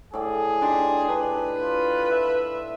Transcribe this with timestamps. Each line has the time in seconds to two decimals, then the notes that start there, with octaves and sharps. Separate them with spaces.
0.14 A2 G#4 D5
0.62 D4 D#4 G4 C6
1.09 D4 B4
1.61 F4
2.11 E5